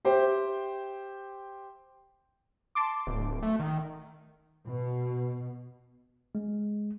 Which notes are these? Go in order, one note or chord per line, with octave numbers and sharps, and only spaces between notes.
G4 C5 E5 G5
A5 C6 D6
D1
A3
D#3
B2
G#3